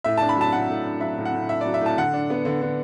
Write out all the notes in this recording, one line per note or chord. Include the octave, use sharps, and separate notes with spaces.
A2 E5
D4 A5
B5
F#3 A5
A2 F#5
A2
D4
F#3 E5
A2
F#5
A2
D4 E5
F#3 D5
E5
A2 A5
D3 F#5
D4
B3
D3
D3